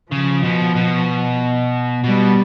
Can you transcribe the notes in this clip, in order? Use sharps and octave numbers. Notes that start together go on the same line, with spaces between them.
C#3 F3
B2
B2
B2 G3